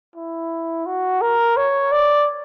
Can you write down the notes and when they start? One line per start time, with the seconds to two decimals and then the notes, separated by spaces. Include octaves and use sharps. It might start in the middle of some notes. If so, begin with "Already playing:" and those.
0.16 E4
0.86 F#4
1.21 A#4
1.57 C#5
1.92 D5